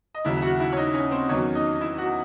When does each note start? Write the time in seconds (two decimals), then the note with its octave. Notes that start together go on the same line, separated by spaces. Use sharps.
0.15 D#5
0.25 D#2 C#3 F#3 E4 E5
0.37 E5
0.42 F#4 F#5
0.60 E4 E5
0.73 C#5
0.77 D#4 D#5
0.94 C#4 C#5
1.11 C4 C5
1.29 E2 D#3 F#3 C#4 C#5
1.55 D#4 D#5
1.81 E4 E5
1.98 F#4 F#5